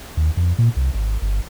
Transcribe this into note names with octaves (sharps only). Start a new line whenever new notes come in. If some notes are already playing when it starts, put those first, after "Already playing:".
D#2
F2
A#2
C2
G#1
G1